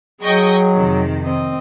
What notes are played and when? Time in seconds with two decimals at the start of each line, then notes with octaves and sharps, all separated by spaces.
0.23 F#3 G#4 D#5 G5 C#6
0.75 F2 C3 D#3
1.25 C4 D#5